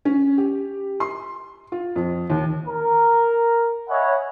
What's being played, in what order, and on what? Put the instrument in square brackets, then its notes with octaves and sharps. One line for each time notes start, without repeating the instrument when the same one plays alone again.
[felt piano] C#4
G4
C6
F4
F2
D#2
[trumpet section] A#4
C#5 D#5 E5 F#5 G#5 B5